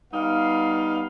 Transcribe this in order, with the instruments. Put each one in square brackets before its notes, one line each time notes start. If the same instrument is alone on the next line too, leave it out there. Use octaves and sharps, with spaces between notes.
[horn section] G3 B3 D#4 F5